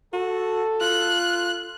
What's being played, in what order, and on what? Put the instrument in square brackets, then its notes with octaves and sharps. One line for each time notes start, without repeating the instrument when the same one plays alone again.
[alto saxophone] F#4 [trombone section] A4
[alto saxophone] F4 [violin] F#6